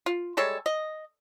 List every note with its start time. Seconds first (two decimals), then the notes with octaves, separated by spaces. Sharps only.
0.06 F4
0.37 G3 G#3 A4 C#5
0.66 D#5